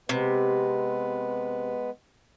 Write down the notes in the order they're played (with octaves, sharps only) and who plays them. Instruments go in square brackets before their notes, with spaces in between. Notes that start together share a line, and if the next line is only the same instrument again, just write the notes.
[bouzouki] C3 [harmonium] G#3 B3 B4